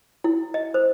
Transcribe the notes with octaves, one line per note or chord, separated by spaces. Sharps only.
E4
D#5
C5